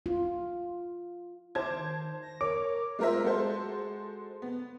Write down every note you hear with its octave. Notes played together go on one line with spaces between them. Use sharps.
F4
C5 A5 D6 G#6
D#3
A#6
A#4 C#5 D6
G#3 F4 A#4 C5 E5
G#3 F#4 A4 C5
B3